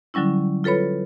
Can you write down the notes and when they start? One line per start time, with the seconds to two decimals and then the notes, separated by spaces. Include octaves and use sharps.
0.14 D3 F#3 G3 C#4 E4
0.64 F4 A4 B4 C#5 B5